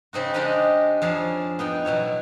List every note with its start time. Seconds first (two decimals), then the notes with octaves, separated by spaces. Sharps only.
0.13 C#3 C4 D#4 F#4
0.34 G#3 D4 D#4 G4 D#5 F5
1.02 F2 D4 G#4 C#5 A5
1.59 B3 D#4 G5
1.85 B2 F#3 E4 C#5